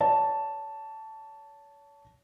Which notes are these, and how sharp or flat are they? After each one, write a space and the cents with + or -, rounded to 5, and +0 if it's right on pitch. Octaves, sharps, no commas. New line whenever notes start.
C#5 +35 A5 +0